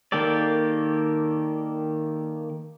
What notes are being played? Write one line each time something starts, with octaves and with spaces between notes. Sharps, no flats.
D#3 A#3 G4 A4 D5